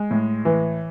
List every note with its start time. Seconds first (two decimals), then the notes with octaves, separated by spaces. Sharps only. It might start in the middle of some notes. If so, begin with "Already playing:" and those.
Already playing: G#3
0.11 A2
0.45 E3